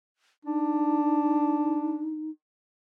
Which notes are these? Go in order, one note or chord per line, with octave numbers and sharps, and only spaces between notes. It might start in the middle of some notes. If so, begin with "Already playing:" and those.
D4 D#4